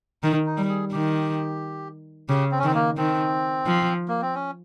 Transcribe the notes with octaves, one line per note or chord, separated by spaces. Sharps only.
D#3 D#4
D#4
G3
G#4
D#3 G4
C#3 G4
C4
C#4
D#3 C4
A#3
D#3 C4
F3
A#3
C4
C#4